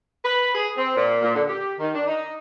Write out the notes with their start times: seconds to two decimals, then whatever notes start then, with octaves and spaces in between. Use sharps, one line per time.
0.23 B4
0.55 G#4
0.77 C4
0.96 A#2
1.23 A#2
1.34 D3
1.48 G4
1.80 D#3
1.95 D4
2.08 D#4